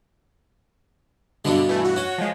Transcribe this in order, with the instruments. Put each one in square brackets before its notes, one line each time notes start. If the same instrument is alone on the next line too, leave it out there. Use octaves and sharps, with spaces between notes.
[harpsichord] G2 B2 G3 [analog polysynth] D3
[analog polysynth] E3 A3
F#4
[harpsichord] C#4
[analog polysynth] F3 G#3